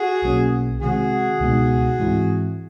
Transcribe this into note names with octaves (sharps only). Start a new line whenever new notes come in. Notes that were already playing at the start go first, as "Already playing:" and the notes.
Already playing: F#4 G#4
B1 B2 F#3 A#3 C#4
C3 D#3 G#3 C4 F#4 G#4
C#2 B2 G#3 B3 D#4
G#2 E3 G#3 C4 E4